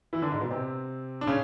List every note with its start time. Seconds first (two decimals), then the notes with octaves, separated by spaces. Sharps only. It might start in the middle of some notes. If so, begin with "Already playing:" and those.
0.13 E3 E4
0.22 D3 D4
0.32 G#2 G#3
0.41 B2 B3
0.51 C3 C4
1.21 D4
1.27 C#3 C#4